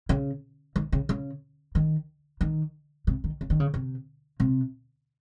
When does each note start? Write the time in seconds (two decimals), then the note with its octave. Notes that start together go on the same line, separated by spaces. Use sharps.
0.09 C#3
0.76 D#3
0.93 C#3
1.09 C#3
1.75 D#3
2.41 D#3
3.07 C3
3.24 D#3
3.41 C#3
3.50 D#3
3.60 C#3
3.74 C3
4.40 C3